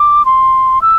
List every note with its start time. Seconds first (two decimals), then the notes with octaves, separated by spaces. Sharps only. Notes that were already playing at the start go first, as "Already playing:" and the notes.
Already playing: D6
0.25 C6
0.82 E6